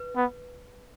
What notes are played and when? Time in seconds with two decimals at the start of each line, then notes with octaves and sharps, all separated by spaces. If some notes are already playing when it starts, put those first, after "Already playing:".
Already playing: B4
0.16 B3